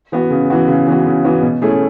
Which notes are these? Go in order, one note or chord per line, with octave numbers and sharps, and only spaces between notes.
E3 B3 F#4
C#3
E3 B3 F#4
C#3
E3 B3 F#4
C#3
E3 B3 F#4
B2
A3 C#4 E4 G#4